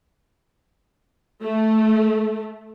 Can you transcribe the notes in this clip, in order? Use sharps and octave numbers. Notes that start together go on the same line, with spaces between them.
A3